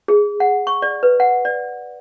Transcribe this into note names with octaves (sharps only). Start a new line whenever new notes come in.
G#4
F#5
C#6
D5
B4
F#5
D5